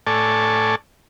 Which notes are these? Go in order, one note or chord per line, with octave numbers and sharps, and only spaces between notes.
A2 A4 D5 G#5 A5 C#6